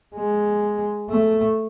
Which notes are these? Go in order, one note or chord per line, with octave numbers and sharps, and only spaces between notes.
G#3
A3